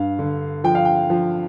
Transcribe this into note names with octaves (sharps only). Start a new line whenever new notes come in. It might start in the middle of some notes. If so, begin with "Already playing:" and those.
Already playing: G2 F5
D3
F3 G5
F5
G5
F3